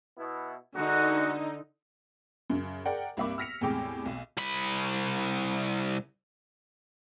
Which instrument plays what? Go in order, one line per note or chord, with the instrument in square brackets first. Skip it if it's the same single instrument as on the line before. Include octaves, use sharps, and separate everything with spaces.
[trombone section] B2 B3 E4
[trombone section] B2 G#3 F#4 [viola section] D3 D#4
[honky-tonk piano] F#2 C#3
G#4 A#4 D5 F#5 G5
C2 G2 A#3 E5 B5 D6
E6 F6 A#6 B6 C#7 F7
E2 A2 C3 G#3 G5 D6
B1
[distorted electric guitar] C2 B5